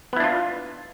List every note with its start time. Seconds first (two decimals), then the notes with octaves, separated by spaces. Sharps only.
0.13 B3
0.16 E4
0.20 D4
0.24 F4